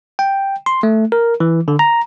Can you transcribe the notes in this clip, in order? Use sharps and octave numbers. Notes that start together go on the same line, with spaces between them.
G5
C6
A3
A#4
E3
D3
A#5